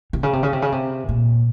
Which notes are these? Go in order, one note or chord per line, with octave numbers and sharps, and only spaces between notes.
C3
C#3
C3
C#3
C3
C#3
C3
A#2